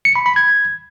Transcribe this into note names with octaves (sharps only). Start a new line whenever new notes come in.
C#7
B5
B5
G#6